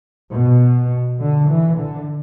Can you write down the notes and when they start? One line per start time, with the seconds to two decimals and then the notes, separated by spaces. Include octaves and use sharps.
0.33 B2
1.20 D3
1.49 E3
1.77 D3